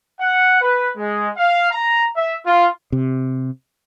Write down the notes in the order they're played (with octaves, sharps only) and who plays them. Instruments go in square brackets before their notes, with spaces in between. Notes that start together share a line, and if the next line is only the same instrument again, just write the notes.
[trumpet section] F#5
B4
G#3
F5
A#5
E5
F4
[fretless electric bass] C3